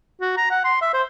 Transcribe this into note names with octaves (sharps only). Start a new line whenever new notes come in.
F#4
A#5
F#5
C6
E5
C5